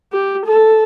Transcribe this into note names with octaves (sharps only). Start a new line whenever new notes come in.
G4
A4